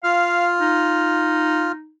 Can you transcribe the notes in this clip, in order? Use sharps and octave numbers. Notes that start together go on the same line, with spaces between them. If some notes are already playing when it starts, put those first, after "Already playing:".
F4 F5 F6
D#4